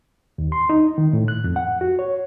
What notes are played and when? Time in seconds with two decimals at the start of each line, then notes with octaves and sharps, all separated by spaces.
0.38 D#2
0.52 C6
0.69 D#4
0.98 D#3
1.13 A2
1.28 F#6
1.44 F2
1.56 F#5
1.81 F#4
1.99 C#5